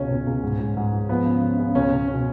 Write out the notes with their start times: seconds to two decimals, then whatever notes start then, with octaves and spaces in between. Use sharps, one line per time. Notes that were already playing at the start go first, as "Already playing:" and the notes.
Already playing: C#2 B2 C#4
0.10 C#2
0.26 C#2
0.43 G#2
0.60 G#2
0.77 G#2
0.93 G#2
1.09 F3 B3
1.25 C#3
1.42 C#3
1.58 C#3
1.75 C#2 C#4
1.91 C#2
2.08 B2 C#4